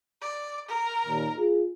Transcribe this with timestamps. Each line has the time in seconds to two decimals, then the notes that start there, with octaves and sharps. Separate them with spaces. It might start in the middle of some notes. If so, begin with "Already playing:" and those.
0.21 D5
0.68 A#4
1.06 D#2 A#2
1.38 F4 G#4